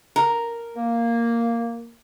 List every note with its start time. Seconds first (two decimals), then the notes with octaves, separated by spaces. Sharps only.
0.16 A#4
0.75 A#3